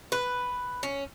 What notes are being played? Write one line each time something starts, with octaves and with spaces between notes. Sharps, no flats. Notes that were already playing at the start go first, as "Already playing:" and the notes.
B4
C#4